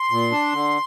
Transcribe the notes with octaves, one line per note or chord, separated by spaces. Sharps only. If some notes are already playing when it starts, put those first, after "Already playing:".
Already playing: C6
A#2
D4
D3